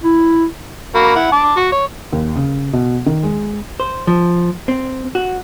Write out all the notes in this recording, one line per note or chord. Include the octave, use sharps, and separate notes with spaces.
E4
A#3 F#4 B5
E4 F#5
A5 D6
F#4
C#5
D#2
C#3
B2
D#3
G#3
C5
F3
C4
F#4